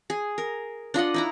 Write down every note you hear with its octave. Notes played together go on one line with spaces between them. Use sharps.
G#4
A#4
D4 F4 D#5 F#5
D#4 E4 A#5